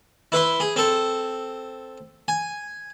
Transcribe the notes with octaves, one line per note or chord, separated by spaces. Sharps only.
E4 B4 E5 C6
G#4
C4 A4
G#5